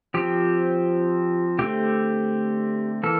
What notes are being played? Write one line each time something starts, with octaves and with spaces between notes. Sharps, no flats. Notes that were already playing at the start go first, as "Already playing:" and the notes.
F3 C4 G4
D3 A3 C4 G4
E3 A#3 A4